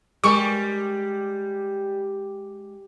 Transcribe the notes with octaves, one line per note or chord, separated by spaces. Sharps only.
G3 G#3 A#4 C#6